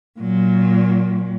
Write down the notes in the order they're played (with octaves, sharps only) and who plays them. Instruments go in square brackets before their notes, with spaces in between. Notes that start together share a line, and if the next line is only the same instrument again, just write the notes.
[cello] A#2 F#3